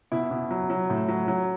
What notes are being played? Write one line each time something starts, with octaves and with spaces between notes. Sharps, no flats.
B2 E4
B2
F#3
F#3
A2
F#3
F#3